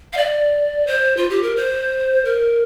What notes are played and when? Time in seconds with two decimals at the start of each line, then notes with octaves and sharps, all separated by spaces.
0.13 F5
0.17 D5
0.87 C5
1.17 F4
1.30 G4
1.43 A#4
1.56 C5
2.25 A#4